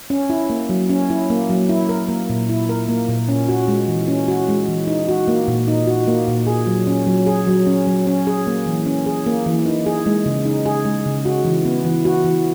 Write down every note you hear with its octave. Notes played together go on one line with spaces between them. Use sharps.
C#4
E4
A#3
F#3
C#4
E4
A#3
F#3
E4
A#4
A#3
A#2
E4
A#4
A#3
A#2
C#4
F#4
G#3
E3
C#4
F#4
G#3
E3
D#4
F#4
A#3
A#2
D#4
F#4
A#3
A#2
G#4
F#3
C#4
F#3
G#4
F#3
C#4
F#3
C#4
G#4
A#3
E3
C#4
G#4
A#3
E3
D#4
G#4
G#3
C#3
D#4
G#4
G#3
C#3
F#4
E3
B3
E3
F#4
E3